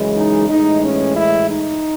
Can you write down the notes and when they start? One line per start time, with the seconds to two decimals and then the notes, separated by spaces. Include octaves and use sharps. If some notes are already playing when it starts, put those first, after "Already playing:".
Already playing: F#2 C#3 E3 G#3
0.15 D#4
0.49 A2 E3 G#3 D#4
0.83 C#4
1.17 E4
1.50 D#4